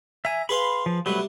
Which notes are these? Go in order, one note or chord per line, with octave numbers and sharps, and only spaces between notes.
E5 G#5 A#5
G#4 B4 F5 B5 C6
F3
C3 F#3 G3 A3 B4